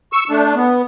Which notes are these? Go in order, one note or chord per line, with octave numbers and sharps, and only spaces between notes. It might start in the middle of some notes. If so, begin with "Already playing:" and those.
C#6 E6
A3 D4
B3